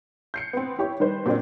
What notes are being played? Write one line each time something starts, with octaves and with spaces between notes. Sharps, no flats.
G6 C7 C#7
B3 C4
E4 G4 C#5
D#3 G3 B4 C5
A#2 F#3 C4 D4